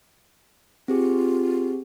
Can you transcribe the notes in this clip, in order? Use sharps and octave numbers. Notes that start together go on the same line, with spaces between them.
C4 F4 G4 G#4